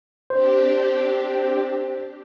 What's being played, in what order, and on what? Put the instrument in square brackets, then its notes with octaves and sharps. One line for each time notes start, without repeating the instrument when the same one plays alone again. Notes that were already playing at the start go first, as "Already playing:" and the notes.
[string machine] C4 D4 G4 [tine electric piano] C5